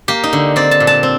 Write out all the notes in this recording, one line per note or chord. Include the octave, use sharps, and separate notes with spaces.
A#3 G4
D#4
D3
C4 D5
A5
A#2
A5
C4